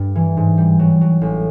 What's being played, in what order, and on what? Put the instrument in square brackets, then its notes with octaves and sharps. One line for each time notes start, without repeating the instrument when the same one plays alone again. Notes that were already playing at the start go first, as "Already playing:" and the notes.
Already playing: [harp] G2
E3
G#2
G3
F#3
F#3
A1